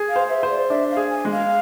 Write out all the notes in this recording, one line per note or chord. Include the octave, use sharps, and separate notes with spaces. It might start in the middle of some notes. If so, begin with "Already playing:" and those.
Already playing: G#4
F5
C5
E5
C5
D5
D4 E5
F5
G#4
G#5
G#3
F5